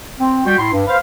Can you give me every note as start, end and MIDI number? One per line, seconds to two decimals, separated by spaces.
0.19 0.43 60
0.46 0.58 55
0.46 0.58 66
0.46 0.58 79
0.58 0.69 45
0.58 0.69 64
0.58 0.69 84
0.71 0.82 43
0.87 0.96 71
0.87 0.96 72
0.87 0.96 77